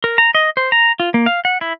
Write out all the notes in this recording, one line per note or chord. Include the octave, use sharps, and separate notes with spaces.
A#4
A#5
D#5
C5
A#5
F4
A#3
F5
F#5
E4